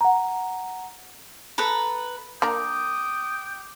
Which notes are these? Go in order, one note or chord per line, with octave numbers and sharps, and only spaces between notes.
F#5 A#5
A4 B4 A#5 B5
A#3 D4 A#4 G5 D6 D#6